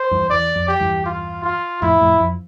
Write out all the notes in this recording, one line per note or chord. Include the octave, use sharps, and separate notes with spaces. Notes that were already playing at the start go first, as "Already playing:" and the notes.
Already playing: C5
E2 G2
E2 D5
F2
G4
E2 G2
F4
F4
F2 A2 E4
F2 A2
F2